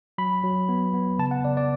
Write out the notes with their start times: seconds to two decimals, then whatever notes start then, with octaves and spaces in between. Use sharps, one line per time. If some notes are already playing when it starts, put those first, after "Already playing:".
0.18 F#3 B5
0.44 F#3
0.69 B3
0.94 B3
1.19 C#3 A5
1.31 F#5
1.44 C#3 D5
1.57 D5